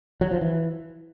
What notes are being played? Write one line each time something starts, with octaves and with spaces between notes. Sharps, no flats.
F#3
F3
E3